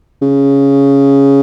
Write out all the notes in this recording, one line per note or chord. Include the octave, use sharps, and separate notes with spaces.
C#3